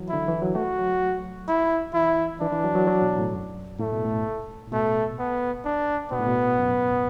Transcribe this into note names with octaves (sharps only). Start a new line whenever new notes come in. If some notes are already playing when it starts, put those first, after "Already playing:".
Already playing: E3 F#3
D3 E4
E3
F#3
A3 F#4
F#3
E4
E3 E4
E3 D4
E3
F#3
F#3
F#3
B2
A2
F#2
A2 A3
B2
A2
A2
B2 A3
B3
D4
B2 B3
A2
B2
F#2